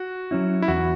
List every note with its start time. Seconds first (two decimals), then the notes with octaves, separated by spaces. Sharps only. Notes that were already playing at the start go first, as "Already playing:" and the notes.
Already playing: F#4
0.31 F#3 C#4 E4
0.62 E4
0.68 E2 F#4